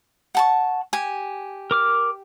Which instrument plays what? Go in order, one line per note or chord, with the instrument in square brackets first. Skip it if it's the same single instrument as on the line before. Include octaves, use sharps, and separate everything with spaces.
[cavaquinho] F#5 A5 C#6
G4 G#5
[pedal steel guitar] A#4 D6 F6